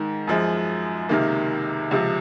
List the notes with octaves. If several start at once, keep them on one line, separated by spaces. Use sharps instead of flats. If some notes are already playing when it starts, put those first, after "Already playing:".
Already playing: G#2 D#3
F#2 F3 G#3
C#2 C3 D#3 A#3
C#2 C3 F3